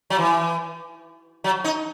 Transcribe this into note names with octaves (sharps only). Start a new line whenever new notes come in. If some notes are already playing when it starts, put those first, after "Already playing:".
F#3
E3
F#3
D#4